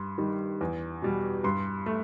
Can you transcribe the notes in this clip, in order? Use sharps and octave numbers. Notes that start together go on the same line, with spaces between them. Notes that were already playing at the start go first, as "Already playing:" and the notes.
Already playing: G2 C6
D#3 G3
E2
B2 G3
G2 C6
A3